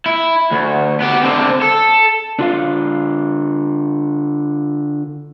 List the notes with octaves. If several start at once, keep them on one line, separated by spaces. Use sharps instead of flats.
E4
D2
B3 G4
D3 C4
A4
D3 F4 F5